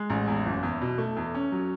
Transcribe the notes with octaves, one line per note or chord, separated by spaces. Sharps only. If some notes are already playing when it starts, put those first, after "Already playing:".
Already playing: G#3
A1
E2
F#1
E2
B2
A3
E2
C#4
F#3